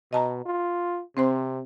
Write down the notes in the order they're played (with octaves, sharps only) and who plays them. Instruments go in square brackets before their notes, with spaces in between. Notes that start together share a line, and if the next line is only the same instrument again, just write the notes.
[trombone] B2 [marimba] D#5 A5 A#5
[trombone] F4
[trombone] C3 [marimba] C4 C5 C6